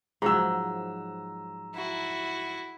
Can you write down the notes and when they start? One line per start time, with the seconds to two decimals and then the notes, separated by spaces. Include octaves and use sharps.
0.22 G#2 F3 F#3 A#5 E6
1.75 E4 F#4